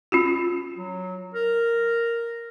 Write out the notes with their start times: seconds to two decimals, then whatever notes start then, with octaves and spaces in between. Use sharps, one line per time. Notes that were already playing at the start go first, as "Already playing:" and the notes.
0.12 C#4 F4 F#4
0.78 F#3
1.34 A#4